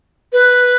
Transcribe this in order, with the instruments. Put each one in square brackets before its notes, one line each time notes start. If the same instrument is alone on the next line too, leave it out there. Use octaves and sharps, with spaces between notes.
[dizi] B4